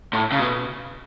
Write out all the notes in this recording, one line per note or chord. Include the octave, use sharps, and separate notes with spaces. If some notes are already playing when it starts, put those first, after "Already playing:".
A2
C#3
B2